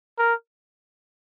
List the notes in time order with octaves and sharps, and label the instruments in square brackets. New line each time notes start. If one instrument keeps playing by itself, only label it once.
[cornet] A#4